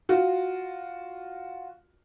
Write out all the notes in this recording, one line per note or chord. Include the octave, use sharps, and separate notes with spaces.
F4 F#4